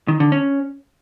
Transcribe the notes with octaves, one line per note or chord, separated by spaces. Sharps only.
D#3
D3
C#4